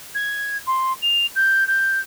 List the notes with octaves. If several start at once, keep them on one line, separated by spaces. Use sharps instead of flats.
G#6
C6
F7
G6
G6